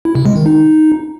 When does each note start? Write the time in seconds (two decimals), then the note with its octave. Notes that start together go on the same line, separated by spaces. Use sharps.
0.05 E4
0.15 C3
0.26 G#3
0.36 D#3
0.46 D#4